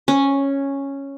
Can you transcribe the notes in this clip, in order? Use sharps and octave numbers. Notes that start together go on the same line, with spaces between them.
C#4